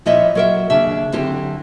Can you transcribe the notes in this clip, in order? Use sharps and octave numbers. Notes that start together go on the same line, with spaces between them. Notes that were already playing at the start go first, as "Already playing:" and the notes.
A#2 F3 E4 C#5 D#5 E5
F#3 A#4 E5
D#2 C#3 D4 E5
F#2 D3 C4 E4 G4